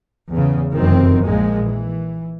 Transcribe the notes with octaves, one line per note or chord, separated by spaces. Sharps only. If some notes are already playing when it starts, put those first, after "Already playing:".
E2 C#3
F1 F#2 D#3 E3 C4
A#1 A#2 F3 G#3
E3